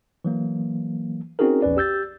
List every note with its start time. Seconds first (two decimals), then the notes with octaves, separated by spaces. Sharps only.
0.25 E3 F#3 A#3
1.39 C4 C#4 D#4 F#4 G#4 A#4
1.62 A#1 E2 C#4 B4 D5
1.77 G4 E6 G6 A6